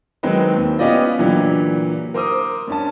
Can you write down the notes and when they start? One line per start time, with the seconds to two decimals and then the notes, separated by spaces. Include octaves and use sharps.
0.23 D#3 F#3 G#3 C4 D#4 B4
0.56 D#2
0.79 B3 C#4 F4 G4 D5 D#5
1.18 A#2 D3 E3 F#3 G4
2.14 A#4 C5 D6 D#6
2.68 G2 C#4 A5